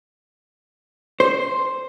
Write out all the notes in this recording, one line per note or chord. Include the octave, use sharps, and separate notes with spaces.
C5